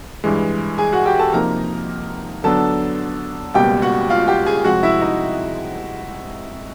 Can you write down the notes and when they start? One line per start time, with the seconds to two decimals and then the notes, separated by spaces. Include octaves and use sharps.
0.24 G2 E3 G#3
0.78 G#4 G#5
0.92 F#4 F#5
1.06 G4 G5
1.19 A4 A5
1.33 C3 F3 A#3 D#4 G4 A#4 A#5
2.44 D3 F#3 B3 D4 A4 A5
3.54 C#2 B2 G3 A#3 G4 G5
3.82 F#4 F#5
4.10 F4 F5
4.27 G4 G5
4.46 G#4 G#5
4.64 C2 C3 F3 G#3 C4 F#4 F#5
4.83 E4 E5
5.01 D#4 D#5